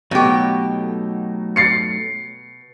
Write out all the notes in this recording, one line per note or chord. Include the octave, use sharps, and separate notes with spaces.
B2 F#3 A3 D#4 G4
A6 C7 C#7